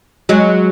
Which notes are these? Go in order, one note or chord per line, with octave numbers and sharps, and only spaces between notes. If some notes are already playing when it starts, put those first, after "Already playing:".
F#3 G#3